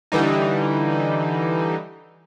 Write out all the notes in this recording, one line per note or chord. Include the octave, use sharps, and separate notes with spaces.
D3 E3 G3 D#4